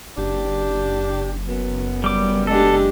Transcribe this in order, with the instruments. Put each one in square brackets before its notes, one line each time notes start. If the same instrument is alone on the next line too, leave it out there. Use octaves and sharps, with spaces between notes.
[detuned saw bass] F#1 [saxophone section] D4 G4
[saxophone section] F#2 B3
[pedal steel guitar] G3 D6
[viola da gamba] G#3 D4 G4 [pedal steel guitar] A4